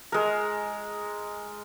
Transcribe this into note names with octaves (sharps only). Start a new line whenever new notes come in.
G#3 A#4